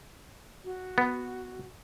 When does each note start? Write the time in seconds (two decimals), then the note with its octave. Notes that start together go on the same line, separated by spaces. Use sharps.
0.65 F#4
0.98 B3